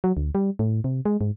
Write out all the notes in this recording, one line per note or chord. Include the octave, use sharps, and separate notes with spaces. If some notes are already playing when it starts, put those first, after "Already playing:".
F#3
D2
G3
A2
C3
G#3
G#2